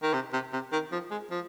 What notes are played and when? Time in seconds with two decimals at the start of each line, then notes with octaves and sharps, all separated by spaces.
0.03 D#3
0.13 C3
0.33 C3
0.53 C3
0.72 D#3
0.92 F3
1.11 G#3
1.31 F3